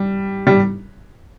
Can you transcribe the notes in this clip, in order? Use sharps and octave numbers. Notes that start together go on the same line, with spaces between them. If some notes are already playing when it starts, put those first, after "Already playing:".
Already playing: G3
G3